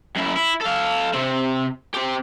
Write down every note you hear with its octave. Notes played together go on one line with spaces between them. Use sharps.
F#2 E4
E4
A4 F5
C3 C4
C4 G4